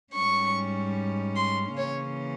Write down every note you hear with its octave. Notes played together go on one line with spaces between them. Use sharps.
G#2 G3 C#4 C#6
C6
C#3 E3 A#3 C#4 C#5